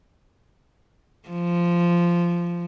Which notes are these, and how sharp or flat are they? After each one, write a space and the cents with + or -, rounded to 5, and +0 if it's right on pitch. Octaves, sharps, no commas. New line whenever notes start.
F3 -10